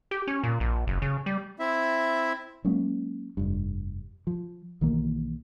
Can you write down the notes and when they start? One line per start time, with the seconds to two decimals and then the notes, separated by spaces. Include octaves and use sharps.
0.11 G4
0.27 C#4
0.43 A#2
0.60 A#1
0.87 F#1
1.02 C#3
1.26 G3
1.60 C4 E4 E5
2.64 F#3 G#3 A#3 C#4
3.37 F1 G2
4.27 F3
4.81 B1 D#3 E3 A#3